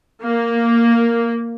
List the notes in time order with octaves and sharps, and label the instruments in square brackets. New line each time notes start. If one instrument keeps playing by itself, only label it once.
[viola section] A#3